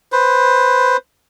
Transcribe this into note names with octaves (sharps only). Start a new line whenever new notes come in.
B4 C5